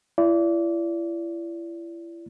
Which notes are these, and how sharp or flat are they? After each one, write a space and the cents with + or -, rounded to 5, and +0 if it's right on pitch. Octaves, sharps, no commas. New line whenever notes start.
E4 +35 D5 -25